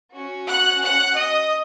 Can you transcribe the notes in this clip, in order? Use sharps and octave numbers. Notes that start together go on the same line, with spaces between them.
C#4 F#4
F#5 F#6
F#5 F#6
D#5 D#6